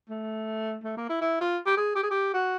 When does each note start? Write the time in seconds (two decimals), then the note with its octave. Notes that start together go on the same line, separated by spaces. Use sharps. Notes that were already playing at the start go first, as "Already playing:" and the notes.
0.10 A3
0.84 A3
0.97 A#3
1.09 E4
1.21 E4
1.41 F4
1.66 G4
1.77 G#4
1.96 G4
2.03 G#4
2.11 G4
2.34 F#4